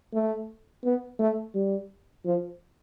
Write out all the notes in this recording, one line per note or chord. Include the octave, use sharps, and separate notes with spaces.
A3
B3
A3
G3
F3